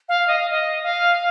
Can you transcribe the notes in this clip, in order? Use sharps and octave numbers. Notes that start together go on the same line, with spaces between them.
F5
D#5
F5
D#5
F5